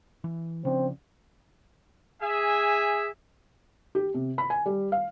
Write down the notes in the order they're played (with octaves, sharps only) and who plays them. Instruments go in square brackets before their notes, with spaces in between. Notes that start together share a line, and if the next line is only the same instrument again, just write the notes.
[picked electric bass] E3
[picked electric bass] C#3 F3 D4 [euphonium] C4
[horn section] G#4 E5 G#5
[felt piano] G4
C3
B5
G#5
G3
F5